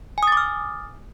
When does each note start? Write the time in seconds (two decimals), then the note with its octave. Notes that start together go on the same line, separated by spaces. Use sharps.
0.18 G#5
0.23 D#6
0.27 A6
0.32 D6
0.37 F6